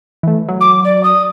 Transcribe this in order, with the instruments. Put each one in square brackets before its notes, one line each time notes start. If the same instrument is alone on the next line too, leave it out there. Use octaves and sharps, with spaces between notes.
[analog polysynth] E3 A3
F#3
[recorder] D6
D5
D#6